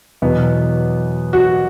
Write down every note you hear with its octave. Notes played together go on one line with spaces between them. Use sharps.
E2 B2 F#3 B3
F#4